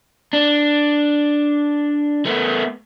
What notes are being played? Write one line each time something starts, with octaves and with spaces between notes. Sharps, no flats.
D4
A3 B3